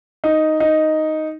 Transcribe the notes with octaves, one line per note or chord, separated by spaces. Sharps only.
D#4
D#4